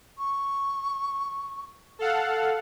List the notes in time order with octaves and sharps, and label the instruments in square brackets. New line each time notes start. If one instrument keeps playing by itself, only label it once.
[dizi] C#6
[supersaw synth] A4 F5 F#5